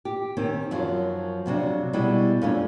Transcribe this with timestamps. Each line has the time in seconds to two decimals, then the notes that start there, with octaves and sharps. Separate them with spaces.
0.05 G4
0.37 D#3 C4 C#4
0.71 F#2 F3 F#3
1.46 F2 C3 F#3 D4
1.93 B2 G3 G#3 E4
2.42 F2 A3 C#4 D4